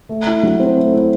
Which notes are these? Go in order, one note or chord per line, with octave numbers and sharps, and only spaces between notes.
A3
E4
F#3
C4
A3
E4